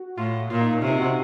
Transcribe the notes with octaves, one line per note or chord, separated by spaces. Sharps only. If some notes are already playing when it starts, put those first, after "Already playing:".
Already playing: F#4
A2 F4
A#2 F4
D#4
D#4
C3 C#4
D#4
F#4
C4